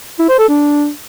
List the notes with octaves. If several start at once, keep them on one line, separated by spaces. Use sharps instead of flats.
E4
C5
A4
D4